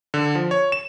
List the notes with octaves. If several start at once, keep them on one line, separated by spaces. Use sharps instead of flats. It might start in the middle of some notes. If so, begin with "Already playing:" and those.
D3
F3
C#5
E7